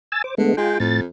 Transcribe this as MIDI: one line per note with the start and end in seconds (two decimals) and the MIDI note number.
0.12 0.22 80
0.12 0.22 88
0.12 0.22 93
0.24 0.35 72
0.24 0.35 86
0.38 0.55 50
0.38 0.54 56
0.38 0.54 57
0.38 0.54 59
0.57 0.78 56
0.57 0.79 65
0.57 0.79 79
0.80 1.05 41
0.80 1.00 45
0.80 1.00 93